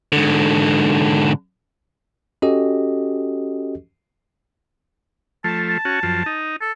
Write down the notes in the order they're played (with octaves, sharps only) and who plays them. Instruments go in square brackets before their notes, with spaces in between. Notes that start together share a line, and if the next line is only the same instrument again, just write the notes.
[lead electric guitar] G#2 D3
[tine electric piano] C#4 F#4 G4 A4 D#5
[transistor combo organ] F3 A3 [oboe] A5
[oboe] A5
[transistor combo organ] C#4 F#4
F#2 F3
D#4
[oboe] A4